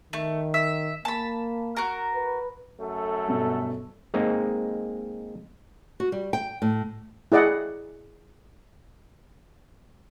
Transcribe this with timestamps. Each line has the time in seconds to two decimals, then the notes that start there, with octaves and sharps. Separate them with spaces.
0.13 D#3 A3
0.54 E5
1.05 A#3 A5 B5
1.77 F#4 A#4
2.15 B4
2.80 F#2 A3 A4
3.28 G2 B2 B3
4.14 G#3 A#3 C4 D#4
6.00 F#4
6.12 G3
6.33 G5
6.62 A2
7.32 E4 G#4 D5 D#5 F#5